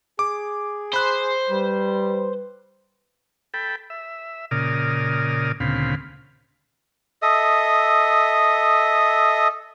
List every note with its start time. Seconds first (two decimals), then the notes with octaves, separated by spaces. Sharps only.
0.19 G#4 D6
0.94 C5 B5 F#6
1.49 G3 B4
3.54 A4 G5 B5
3.90 E5
4.51 A#2 C#3 A#4 D5 D#6 F6
5.60 D2 A#2 C#3 C4 F5 B5
7.22 A4 D#5 E5 D#6